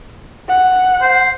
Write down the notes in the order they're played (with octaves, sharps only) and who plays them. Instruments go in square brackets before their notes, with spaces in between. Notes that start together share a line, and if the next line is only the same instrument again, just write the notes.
[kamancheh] F#5
[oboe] C5